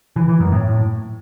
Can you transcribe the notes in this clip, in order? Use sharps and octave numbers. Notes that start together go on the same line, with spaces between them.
E3
E3
F#2
A2